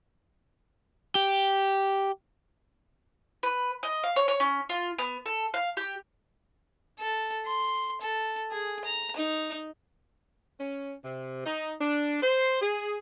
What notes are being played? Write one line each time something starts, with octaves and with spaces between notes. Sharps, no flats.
G4
B4
D#5
F5
C#5
C#5
C#4
F4
B3
A4
F5
G4
A4
C6
A4
G#4
A#5
D#4
C#4
C3
D#4
D4
C5
G#4